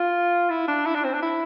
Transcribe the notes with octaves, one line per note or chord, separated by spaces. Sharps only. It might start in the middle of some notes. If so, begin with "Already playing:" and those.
Already playing: F4
E4
D4
E4
D4
C4
D4
E4